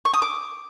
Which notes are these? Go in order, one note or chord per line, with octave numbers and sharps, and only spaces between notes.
C#6
D#6
D6